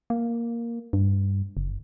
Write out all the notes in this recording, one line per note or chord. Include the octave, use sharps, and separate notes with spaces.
A#3
G2
F#1